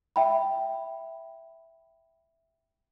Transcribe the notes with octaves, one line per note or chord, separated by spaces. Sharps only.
E5 G5 B5